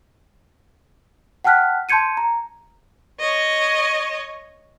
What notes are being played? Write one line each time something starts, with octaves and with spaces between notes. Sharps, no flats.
F#5 G5 A5 F6 F#6 B6
A5 C6 G6 G#6 C#7 D#7
A#5
C#5 D#5